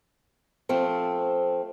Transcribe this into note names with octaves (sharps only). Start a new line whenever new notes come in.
F3 A3 C4